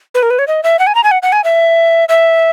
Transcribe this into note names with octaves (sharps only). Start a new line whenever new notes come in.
B4
A#4
B4
C#5
D#5
E5
F#5
G#5
A#5
G#5
F#5
F#5
G#5
E5
E5